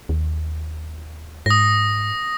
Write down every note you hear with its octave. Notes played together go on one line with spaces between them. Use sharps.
D#2
G#2 D#6 A#6